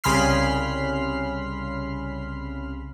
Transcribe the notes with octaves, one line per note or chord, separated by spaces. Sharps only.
C2 C#3 B5 C6 F6 C7